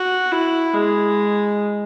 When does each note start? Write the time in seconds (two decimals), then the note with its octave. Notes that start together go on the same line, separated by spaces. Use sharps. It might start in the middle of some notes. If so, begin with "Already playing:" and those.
Already playing: F#4
0.32 E4
0.74 G#3